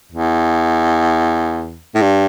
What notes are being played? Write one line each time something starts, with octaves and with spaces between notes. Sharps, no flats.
E2
A2
G2